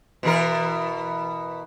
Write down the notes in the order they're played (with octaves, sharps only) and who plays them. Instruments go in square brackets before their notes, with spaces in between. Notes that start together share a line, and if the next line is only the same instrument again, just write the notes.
[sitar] B2 E3 A#4